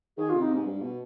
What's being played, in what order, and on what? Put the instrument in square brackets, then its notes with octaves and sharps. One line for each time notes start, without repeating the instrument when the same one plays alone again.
[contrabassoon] D#3 [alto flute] G#4
[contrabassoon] C3 [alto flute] F4
[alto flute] D#4
[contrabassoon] G#2
G2
B2